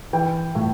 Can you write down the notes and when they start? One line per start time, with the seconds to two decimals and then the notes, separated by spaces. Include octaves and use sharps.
0.13 E3 G5
0.55 A2